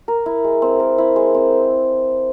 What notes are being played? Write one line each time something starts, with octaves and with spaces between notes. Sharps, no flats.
A#4
E4
G#3
C4
A#4
E4
G#3
C4